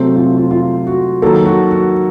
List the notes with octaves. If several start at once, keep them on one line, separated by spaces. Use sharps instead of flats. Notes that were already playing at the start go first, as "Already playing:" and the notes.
Already playing: C3 F#3 A3 C4 C5
F4
F4
F4
F#4
D#3 F#3 A#3 A4
F#4
F#4